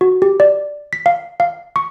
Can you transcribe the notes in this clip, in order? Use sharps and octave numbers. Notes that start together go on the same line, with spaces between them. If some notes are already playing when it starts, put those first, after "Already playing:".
F#4
G4
D5
B6
F5
F5
C#6